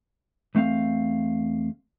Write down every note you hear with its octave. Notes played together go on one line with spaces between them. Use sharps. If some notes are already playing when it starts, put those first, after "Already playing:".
E2 A3 C4 F5